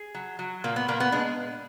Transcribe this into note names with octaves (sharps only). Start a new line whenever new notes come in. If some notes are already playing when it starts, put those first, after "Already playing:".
Already playing: G#4
F#3
F#3
A#2 A#3
B3
A#2 A#3
B3
G#3 D4